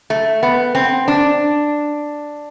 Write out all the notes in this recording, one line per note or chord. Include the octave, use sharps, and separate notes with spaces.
A3
B3
C4
D4